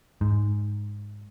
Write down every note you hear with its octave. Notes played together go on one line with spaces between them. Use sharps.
G#2